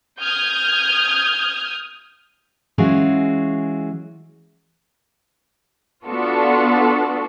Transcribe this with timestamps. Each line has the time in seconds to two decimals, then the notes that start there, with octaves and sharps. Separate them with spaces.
0.22 D#6 F6 G6 G#6
2.78 E3 G#3 C#4 F4 F#4 G#4
6.06 B3 D4 F4 F#4 A4